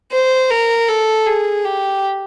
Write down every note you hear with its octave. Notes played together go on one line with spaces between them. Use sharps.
C5
A#4
A4
G#4
G4